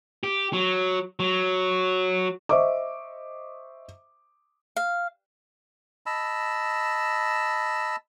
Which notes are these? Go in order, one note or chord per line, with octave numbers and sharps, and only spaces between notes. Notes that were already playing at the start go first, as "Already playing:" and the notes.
G4
F#3
F#3
C5 D#5 E5 C#6 D6
F5
D#5 A5 B5 E6